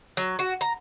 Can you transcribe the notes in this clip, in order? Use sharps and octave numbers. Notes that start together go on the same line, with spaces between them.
F#3
F#4
A#5